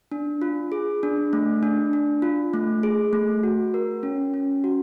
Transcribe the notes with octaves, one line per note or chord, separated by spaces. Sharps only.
D4
F4
G#4
D4
A3
D4
D4
F4
A3
G#4
A3
F#4
A#4
C#4
C#4
F#4